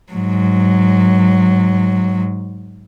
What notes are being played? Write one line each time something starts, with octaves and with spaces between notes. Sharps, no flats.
G#2 F#3